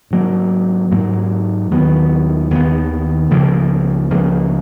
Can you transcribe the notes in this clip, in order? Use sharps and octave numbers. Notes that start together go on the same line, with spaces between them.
G#2 F#3 A#3
G#2 F#3 A#3
D#2 D#3 F#3 B3
D#2 D#3 F#3 B3
C#2 C#3 F3 A#3
C#2 C#3 F3 A#3